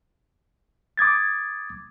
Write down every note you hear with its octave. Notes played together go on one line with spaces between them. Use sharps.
D6 D#6 G#6 A6